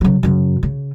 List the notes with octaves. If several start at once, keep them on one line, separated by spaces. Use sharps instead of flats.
C#3 F#3
F#2 C#3
C#3